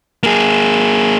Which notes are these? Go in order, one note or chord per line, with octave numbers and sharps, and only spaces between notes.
A#3 G#4